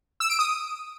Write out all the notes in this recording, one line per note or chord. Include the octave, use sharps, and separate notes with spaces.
E6
D7
D#6